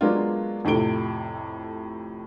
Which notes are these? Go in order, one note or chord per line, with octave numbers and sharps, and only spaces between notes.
F#3 G#3 A#3 B3 D4 F4
F2 A2 C3 A4 D7 G7